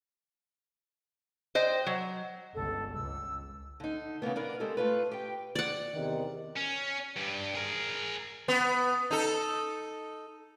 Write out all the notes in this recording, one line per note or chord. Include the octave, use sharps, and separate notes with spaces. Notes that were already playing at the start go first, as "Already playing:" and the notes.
C5 D#5 G5
F#3
G1 C#2 D3 A4
C#2 E6
D3 D#4
C#3 E3 A#3 B3
B3 D4 A#4 B4
G#3 C4 G4 A4
A3 F4 B4
G4 G5
D5 F#5
E2 C3 D#3
C#4
G2 G3
G#4 A#4
B3
D#4 A4